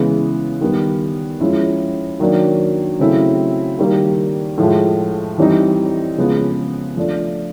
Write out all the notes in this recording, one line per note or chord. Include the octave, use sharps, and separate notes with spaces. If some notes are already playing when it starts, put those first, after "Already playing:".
Already playing: C#3 E3 G#3 B3
D#3 G3 B3
F3 G#3 C#4 E4
D#3 F#3 A#3 D4
C#3 F#3 A3 C4 E4
D#3 G3 A#3
A2 F3 G#3
E3 G3 C4 D#4
C#3 F3 G#3 B3
F3 A3 D4